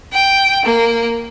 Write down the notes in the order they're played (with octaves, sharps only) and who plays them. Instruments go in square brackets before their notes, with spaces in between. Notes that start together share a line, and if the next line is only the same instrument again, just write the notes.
[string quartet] G5
A#3